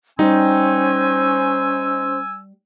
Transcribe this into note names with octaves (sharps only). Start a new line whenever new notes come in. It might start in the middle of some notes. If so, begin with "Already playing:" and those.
G3 C#4 D#4 G4 C5 G#5 C6 E6